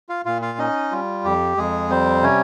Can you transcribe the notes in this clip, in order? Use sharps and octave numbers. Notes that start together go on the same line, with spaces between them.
F4 F5
A#2 F4 F5
F4 F5
C#4 D#4 D#5
G3 F4
F2 G4
F2 G#3 G#4
G3 C4 C5
C3 C#4 C#5